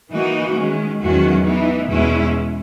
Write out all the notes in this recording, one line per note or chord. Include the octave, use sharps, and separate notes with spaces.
E3 A#3 D#4 F#4
D#3 G#3 C#4
E2 D#3 F#3 C#4 F#4
E3 B3 D#4
E2 B2 G#3 C#4 E4